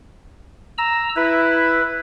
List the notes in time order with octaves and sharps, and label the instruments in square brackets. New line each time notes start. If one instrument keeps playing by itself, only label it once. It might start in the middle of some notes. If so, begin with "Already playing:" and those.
[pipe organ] A#5 E6
[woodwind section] E4 [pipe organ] B4